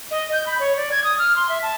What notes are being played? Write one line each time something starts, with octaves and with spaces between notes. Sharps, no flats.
D#5
G6
B5
C#5
D5
G#6
D#6
F6
C6
E5
A5